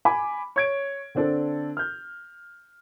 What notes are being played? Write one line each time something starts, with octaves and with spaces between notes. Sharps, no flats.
G#5 B5 D6
C#5 G#6 D7
D3 C4 D4 A4
F6 G6